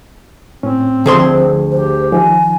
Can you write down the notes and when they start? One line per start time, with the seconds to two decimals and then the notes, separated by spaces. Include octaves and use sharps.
0.63 A2 C4 C#4
1.06 D2 D3 F3 G#4 C5 C6
1.71 G4 C5
2.12 D#3 F3 G#5